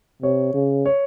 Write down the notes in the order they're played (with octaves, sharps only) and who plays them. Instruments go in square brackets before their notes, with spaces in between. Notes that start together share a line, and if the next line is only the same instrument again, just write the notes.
[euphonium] C3 [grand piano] C#5
[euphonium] C#3
[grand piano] C#5